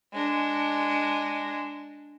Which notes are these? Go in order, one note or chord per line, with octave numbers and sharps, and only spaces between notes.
G#3 D4